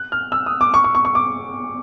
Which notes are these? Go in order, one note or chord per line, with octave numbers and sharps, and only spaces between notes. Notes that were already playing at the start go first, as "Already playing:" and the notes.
Already playing: F#6
F6
E6
D#6
D6
C#6
C#6
C#6
C#6
D6